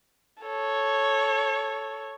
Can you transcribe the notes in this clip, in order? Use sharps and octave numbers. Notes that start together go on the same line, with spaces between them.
A4 C#5